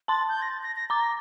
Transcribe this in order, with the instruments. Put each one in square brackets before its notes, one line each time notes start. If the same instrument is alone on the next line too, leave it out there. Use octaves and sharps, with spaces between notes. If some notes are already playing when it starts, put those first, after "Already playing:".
[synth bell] A5 C6 [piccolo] A6
[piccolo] G6
A#6
A6
A#6
A#6
[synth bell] A#5 D6 [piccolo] A6
[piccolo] A#6